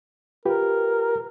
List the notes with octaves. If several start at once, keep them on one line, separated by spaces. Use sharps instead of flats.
F4 G4 A#4 B4